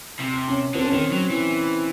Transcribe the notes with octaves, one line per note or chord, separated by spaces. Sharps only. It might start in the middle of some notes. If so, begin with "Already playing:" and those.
C3
C#4
D3 C4
C#4
D#3 C4
F#3
E3